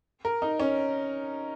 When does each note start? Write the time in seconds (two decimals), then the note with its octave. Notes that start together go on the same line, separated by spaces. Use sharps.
0.25 A#4
0.42 D#4
0.60 C#4